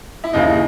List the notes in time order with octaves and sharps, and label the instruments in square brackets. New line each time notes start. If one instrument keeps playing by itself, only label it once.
[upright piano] E4
D#2 C#3 E3 D#4